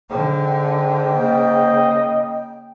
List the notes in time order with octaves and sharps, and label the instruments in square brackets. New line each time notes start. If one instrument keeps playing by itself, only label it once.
[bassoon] G#2 [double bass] D3 [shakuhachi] G5
[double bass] C#3 A#3 [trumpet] D#5